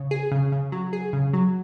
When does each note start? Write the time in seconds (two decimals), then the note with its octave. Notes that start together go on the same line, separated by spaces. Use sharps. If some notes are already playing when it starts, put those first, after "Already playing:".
Already playing: C#3
0.11 G#4
0.32 C#3
0.52 C#3
0.72 F#3
0.93 G#4
1.13 C#3
1.34 F#3